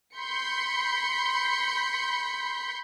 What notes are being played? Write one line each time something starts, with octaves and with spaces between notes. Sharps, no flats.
B5 C6 G6 B6 C#7